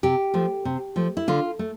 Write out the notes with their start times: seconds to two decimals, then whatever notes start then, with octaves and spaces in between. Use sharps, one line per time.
0.03 C3 G4
0.34 F3 A3
0.65 C3
0.96 F3 A3
1.17 E4
1.28 D3 F4
1.59 A3